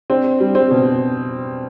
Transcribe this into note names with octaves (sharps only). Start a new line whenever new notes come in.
C4 D4
G3
C4
B2